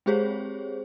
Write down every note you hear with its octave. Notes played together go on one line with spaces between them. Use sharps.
G#3 C4 G4 G#4 C5 C#5